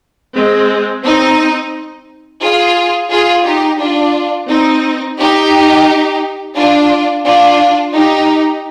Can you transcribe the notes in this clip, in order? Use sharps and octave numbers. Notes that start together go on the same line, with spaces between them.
G#3 C4
C4 D#4
F4 G#4
F4 G#4
D#4 G4
D4 F4
C4 D#4
D#4 G4
D4 F4
D4 F4
D#4 G4